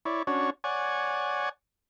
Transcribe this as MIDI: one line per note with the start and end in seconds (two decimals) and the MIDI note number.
0.05 0.23 64
0.05 0.23 73
0.05 0.23 74
0.27 0.50 61
0.27 0.50 62
0.27 0.50 66
0.27 0.50 73
0.64 1.49 73
0.64 1.49 74
0.64 1.49 78
0.64 1.49 80